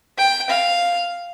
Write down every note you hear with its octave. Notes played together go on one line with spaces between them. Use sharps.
G5
F5